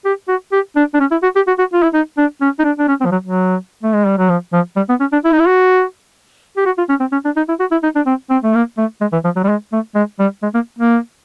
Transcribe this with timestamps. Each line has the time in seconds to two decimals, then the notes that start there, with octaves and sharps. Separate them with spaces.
0.05 G4
0.28 F#4
0.52 G4
0.76 D4
0.94 D4
1.00 C#4
1.11 E4
1.23 F#4
1.36 G4
1.47 F#4
1.59 F#4
1.73 F4
1.83 E4
1.94 D#4
2.18 D4
2.41 C#4
2.59 D#4
2.64 D4
2.79 D4
2.88 C#4
3.01 C4
3.05 F3
3.12 F#3
3.24 F#3
3.83 A3
3.94 G#3
4.07 G3
4.18 F#3
4.29 F3
4.53 F3
4.76 G3
4.89 B3
5.00 C#4
5.13 D4
5.25 E4
5.32 D#4
5.39 E4
5.47 F#4
6.57 G4
6.66 F#4
6.78 F4
6.89 C#4
7.00 C4
7.12 C#4
7.25 D4
7.37 D#4
7.49 E4
7.60 F#4
7.71 E4
7.83 D#4
7.96 D4
8.06 C4
8.30 C4
8.44 A3
8.55 A#3
8.78 A3
9.01 G#3
9.12 E3
9.25 F3
9.36 F#3
9.44 G3
9.49 G#3
9.72 A3
9.95 G#3
10.19 G3
10.43 G#3
10.54 A#3
10.79 A#3